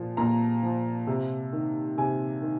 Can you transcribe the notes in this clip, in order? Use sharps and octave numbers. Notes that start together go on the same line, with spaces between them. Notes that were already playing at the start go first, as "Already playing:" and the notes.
Already playing: A#2 F3
A#2 A#5
F3
C3
D#3
C3 G#5
D#3